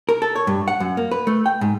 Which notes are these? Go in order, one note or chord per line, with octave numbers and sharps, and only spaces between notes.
A#4
A4
C#5
G2
F#5
F#2
A#3
B4
A3
G5
G#2